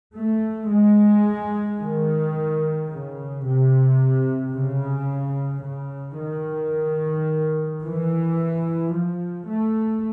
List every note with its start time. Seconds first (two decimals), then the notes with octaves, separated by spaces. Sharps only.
0.15 A3
0.70 G#3
1.80 D#3
2.89 C#3
3.45 C3
4.54 C#3
5.63 C#3
6.19 D#3
7.83 E3
8.93 F3
9.47 A3